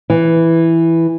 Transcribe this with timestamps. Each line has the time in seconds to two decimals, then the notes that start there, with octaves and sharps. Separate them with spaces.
0.10 E3